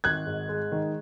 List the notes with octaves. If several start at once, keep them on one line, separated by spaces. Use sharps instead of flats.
G#1 F#6 G#6
G#2
G#3
D#3